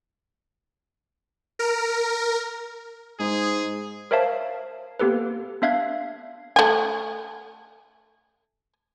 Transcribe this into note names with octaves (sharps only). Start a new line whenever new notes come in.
A#4
G#2 G#4
A#4 C5 C#5 E5 F5 A5
A#3 B3 G4 A4 B4
B3 D4 E5 F5 F#6 G#6
A3 G#5